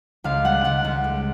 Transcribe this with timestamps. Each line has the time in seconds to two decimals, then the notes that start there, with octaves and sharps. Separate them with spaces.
0.24 C#2 F5
0.44 G3 F#5
0.64 C#2 F#5
0.84 C#2
1.04 G#3